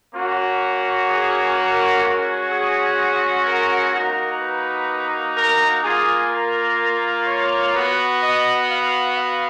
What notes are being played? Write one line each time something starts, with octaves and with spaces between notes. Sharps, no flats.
A#3 C#4 F#4
G#4
A#4
G#3 C#4 F#4
G#4
A#4
A#3 D#4 F#4 A#4
B4
A#4
A#3 F4 G#4
A#4
C#5
B3 F#4
D#5
F5
F5